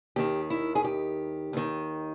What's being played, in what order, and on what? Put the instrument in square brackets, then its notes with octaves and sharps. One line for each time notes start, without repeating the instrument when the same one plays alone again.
[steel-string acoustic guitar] D#2 D#3 G4
E4
G#4
G4
D#2 D#3